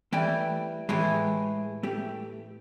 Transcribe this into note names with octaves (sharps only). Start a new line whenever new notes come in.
E3 G3 A3 G5
A2 E3 G#3 G4 G#4
A3 G4